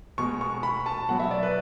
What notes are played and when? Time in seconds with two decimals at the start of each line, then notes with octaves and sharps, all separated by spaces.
0.18 B2 G#3 C#6
0.41 C#6
0.63 B5
0.86 A5
1.09 B2 F#3 F#5
1.20 E5
1.31 D5
1.43 B4